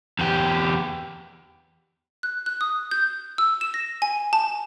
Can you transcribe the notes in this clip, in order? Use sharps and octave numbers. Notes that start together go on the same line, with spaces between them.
E2 G4
F#6
F#6
D#6
G6
E6
E7
A#6
G#5
A5